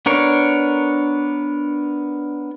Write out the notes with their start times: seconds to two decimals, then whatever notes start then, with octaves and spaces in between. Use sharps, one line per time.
0.06 B3 D4 A#4 C#5